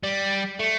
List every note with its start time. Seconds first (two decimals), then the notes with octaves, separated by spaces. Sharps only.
0.03 G3
0.60 A3